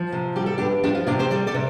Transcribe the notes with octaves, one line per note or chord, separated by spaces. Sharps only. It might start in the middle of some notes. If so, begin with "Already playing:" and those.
Already playing: F3
C3
G3 G4
A4
G2 D4 G4
F3 D4 G4
F4
C3 D4 G4
G4 C5
G3 A4 D5
A4 D5
C3